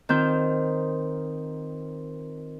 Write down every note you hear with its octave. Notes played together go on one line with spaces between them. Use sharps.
D#3 C4 F4 G6